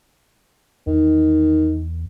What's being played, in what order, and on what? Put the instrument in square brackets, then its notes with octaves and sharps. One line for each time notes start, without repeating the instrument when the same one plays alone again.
[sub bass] E2 [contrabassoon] D#3